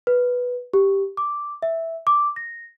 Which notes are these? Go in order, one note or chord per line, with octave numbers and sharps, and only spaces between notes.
B4
G4
D6
E5
D6
A#6